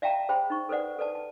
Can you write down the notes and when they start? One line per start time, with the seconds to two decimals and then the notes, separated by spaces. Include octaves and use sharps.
0.02 D5 E5 F5 G5 A5 A#5
0.29 G#4 C5 G5 B5
0.50 D#4 C#6
0.69 A4 B4 C5 D5 F#5
0.99 A4 B4 D5 A5
1.15 A5